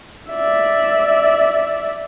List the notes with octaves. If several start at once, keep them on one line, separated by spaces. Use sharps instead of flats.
D5 E5